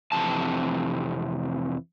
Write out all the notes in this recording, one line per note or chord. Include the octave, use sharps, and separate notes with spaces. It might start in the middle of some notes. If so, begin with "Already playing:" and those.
F2 C3 E3 A5